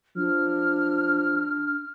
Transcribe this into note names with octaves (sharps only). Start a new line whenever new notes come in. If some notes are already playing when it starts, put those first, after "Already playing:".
F3 D4 F6